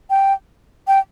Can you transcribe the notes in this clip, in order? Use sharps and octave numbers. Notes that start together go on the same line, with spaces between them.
G5
G5